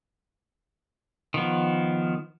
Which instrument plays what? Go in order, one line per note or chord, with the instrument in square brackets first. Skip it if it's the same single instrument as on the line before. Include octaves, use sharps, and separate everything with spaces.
[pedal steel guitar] D#3 F3 B3